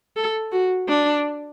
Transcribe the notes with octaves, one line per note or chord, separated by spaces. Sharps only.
A4
F#4
D4